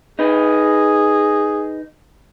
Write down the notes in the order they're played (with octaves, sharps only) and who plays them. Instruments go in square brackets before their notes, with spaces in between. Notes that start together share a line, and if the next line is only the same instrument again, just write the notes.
[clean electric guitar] D#4 B4 [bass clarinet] G#4